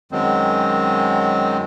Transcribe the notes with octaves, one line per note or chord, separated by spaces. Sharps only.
F#2 D#3 F#3 G#3 C4